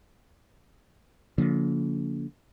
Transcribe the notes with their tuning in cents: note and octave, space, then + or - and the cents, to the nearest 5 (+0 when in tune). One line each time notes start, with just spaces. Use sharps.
D3 -40 F3 +20 A#3 +0